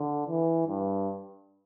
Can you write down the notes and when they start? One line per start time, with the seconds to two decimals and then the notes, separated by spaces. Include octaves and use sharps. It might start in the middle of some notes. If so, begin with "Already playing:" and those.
Already playing: D3
0.28 E3
0.67 G2